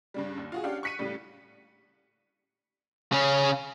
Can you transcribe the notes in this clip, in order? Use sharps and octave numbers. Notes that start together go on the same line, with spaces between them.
G2 C#3 G3
D#2
F4 F#4 G#4
C#4 D4 G4 F5 F#5
C#6 F#6 B6 C#7 D#7
A2 C#3 G3
C#3 C#4